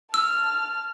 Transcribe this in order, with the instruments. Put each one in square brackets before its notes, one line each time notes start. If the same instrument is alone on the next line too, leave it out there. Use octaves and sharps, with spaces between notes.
[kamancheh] A5 F6 [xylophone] E6